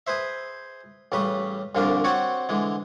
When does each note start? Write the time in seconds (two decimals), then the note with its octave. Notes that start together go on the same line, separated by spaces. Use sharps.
0.07 G#4 B4 C5 E5
1.12 A1 C#3 G3 B4 B5
1.75 C2 A#2 D3 F3 D4 A#4
2.04 C4 F#4 C#5 D5 F#5
2.49 D3 E3 G#3